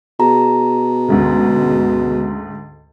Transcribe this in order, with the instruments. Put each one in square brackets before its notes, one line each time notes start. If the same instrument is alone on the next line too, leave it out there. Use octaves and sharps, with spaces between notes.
[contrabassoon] B2 [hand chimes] G#4 A5 A#5
[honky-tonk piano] D2 G#2 C#3